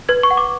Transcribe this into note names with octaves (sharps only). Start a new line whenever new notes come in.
B4 G#6
C#6
F#5
D6